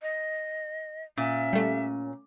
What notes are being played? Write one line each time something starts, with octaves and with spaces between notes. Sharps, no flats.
D#5
A#2 C#4 E5
G3 A3